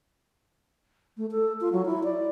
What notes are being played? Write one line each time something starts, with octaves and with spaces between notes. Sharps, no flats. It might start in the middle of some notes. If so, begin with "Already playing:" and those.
A3
A4
F4
F#3
E4
D5